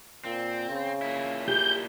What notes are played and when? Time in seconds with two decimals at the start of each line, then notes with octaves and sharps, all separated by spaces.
0.25 A#2 C4
0.70 C#3
1.02 A#2 A#3 E4
1.48 G4 G#4 G6